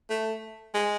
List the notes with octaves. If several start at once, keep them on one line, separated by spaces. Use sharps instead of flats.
A3
G#3